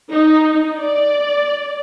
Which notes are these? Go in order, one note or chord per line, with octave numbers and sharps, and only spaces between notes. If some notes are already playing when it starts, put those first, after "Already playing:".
D#4
D5